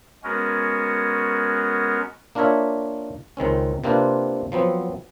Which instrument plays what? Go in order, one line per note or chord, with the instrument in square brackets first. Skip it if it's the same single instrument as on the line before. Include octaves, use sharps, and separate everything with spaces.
[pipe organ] G#3 B3 C#4 F#4 A#4
[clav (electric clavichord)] A#3 D4 F4 A#4 C#5 E5
C#2 D#3 C4 C#4
C3 A#3 C4 D4 F4 B4
F3 F#3 B3 C4